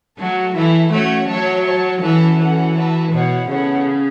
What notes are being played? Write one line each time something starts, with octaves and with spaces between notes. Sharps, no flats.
F#3 A3 F#4 A4
E3 A3 E4 A4 E5
A3 C#4 F#4 C#5 F#5
F#3 F#4 C#5 E5 A5
F#4 C#5 A5
E3 C#4 F#4 A4 E5 A5
E3 C#4 F#4 A4 F#5
A3 F#4 B4 E5 A5
B2 E4 C#5 F#5
C#3 B3 E4 A4 C#5 F#5